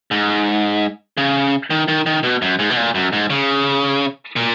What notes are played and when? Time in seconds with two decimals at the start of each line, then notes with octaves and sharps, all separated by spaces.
0.11 G#2
1.17 C#3
1.70 D#3
1.88 D#3
2.06 D#3
2.23 B2
2.42 F#2
2.59 G#2
2.70 B2
2.77 A#2
2.95 F#2
3.13 G#2
3.30 C#3
4.36 A#2